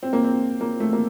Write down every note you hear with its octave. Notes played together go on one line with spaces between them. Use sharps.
C4
A#3
C4
A#3
A3
A#3